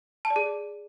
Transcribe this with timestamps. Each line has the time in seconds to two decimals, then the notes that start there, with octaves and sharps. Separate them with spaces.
0.25 A5
0.30 D5
0.36 G#4